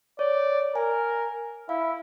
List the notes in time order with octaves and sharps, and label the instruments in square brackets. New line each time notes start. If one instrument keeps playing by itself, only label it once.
[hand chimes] C#5 [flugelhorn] D5
[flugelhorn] A#4 [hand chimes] G#5
[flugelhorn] E4 [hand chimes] F5